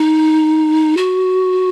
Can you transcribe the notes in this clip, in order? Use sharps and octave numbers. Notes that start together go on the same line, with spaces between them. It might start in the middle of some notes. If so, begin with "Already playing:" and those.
Already playing: D#4
F#4